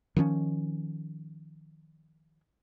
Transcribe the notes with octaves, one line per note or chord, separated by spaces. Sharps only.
D#3 F3 B3 C#4